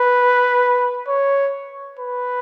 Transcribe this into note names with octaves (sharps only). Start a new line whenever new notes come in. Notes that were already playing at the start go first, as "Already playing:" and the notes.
Already playing: B4
C#5
B4